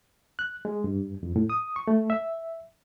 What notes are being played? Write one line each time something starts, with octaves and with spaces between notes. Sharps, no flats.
F#6
G#3
G2
F2
A2
D#6
C#6
A3
E5